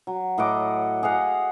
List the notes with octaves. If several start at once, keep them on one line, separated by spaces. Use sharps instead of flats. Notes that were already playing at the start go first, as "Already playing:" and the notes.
F#3
A2 D#5 F#5 D6
G#4 D#5 F5 F#5